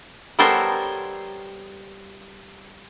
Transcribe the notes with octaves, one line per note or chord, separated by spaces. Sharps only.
G3 B3 A4 A#4 C5 C#5